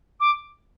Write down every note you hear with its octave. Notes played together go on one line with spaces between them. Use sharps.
D6